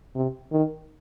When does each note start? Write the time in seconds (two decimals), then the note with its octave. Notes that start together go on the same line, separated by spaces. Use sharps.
0.15 C3
0.52 D#3